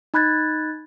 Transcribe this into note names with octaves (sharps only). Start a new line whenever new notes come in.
D#4 B5 F#6 G#6 A6